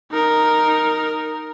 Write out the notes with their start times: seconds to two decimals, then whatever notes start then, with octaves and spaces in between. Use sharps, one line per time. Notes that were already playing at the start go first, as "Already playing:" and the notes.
0.11 D#4 A#4